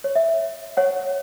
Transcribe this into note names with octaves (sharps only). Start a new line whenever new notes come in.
C#5
E5
C#5 F#5